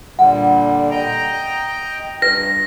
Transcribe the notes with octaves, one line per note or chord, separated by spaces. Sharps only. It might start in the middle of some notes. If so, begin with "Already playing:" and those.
A#2 D3 G3 F#5
D#5 G5 A#5
G2 B4 A#6